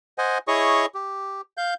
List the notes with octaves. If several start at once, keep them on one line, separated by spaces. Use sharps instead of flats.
C5 D#5 F#5 G#5
E4 G#4 C#5 D#5 C#6 D#6
G4
F5 G6